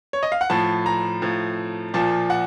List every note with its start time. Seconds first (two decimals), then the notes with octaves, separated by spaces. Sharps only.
0.13 C#5
0.23 D#5
0.32 F5
0.41 F#5
0.50 A2 F3 A5
0.86 A#5
1.22 A2 F3
1.94 A#2 F3 A5
2.30 F#5